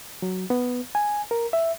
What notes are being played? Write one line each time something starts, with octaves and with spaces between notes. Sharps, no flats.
F#3
B3
G#5
A#4
E5